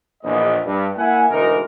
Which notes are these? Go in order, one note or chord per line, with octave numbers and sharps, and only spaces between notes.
A#1 E2 D#5
G2
A#3 E4 E5 F#5 G#5
D2 B2 E3 G#3 D#4 A#4